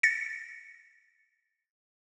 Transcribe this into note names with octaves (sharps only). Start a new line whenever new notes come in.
A6 A#6 C#7